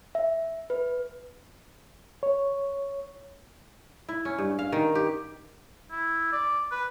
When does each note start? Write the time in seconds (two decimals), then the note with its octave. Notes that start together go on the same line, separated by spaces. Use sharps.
0.15 E5
0.70 B4
2.23 C#5
4.09 E4
4.25 C#4
4.38 G2
4.59 F5
4.72 D#3
4.95 G4
5.91 E4
6.32 D5
6.71 B4